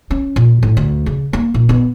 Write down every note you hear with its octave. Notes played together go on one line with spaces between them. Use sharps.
C#4
A#2
A2
D2
C#3
A#3
A#2
B3